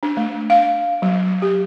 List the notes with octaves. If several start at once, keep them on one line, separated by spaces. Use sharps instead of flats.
D4
A3
F5
F#3
G4